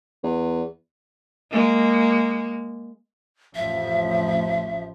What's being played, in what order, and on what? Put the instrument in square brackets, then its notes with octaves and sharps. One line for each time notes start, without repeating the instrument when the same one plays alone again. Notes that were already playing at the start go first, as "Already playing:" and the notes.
[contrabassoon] E2
[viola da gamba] G#3 A#3
[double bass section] A1 F2 F3 [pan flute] E5